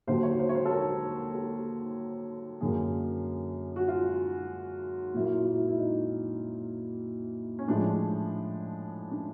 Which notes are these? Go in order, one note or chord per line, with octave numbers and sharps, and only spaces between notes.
D#2 D3 F#3 C5
C#5
C5
C#5
C5
A4
A#4
A4
F#2 D3 F#3 A#3 G#4
F#4
F4
A#2 F#3 A#3 E4
F4
E4
F4
E4
E4
D#4
C#4
A2 F3 G#3 D4
D4